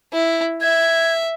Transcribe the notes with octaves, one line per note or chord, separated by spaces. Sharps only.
E4
E5 G#6